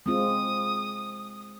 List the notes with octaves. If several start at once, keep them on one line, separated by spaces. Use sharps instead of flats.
G#3 C4 F4 D#6